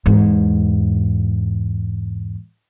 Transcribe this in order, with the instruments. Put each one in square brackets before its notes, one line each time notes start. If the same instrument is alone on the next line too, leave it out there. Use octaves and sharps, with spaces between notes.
[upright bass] E2 G#2